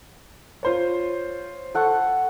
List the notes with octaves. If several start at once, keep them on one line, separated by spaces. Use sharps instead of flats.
F4 C5 C#5
A4 F#5 C#6